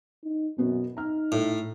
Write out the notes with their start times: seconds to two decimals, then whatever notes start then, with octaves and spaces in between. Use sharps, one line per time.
0.24 D#4
0.58 F#2 B2 B3 F#4
0.97 D#4 A#5 F6
1.32 A2